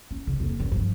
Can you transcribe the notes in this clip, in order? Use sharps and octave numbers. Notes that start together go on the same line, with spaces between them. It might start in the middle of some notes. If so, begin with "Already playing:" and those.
C#4
C#3
F2 A#3
F#2 D#3
G2 F3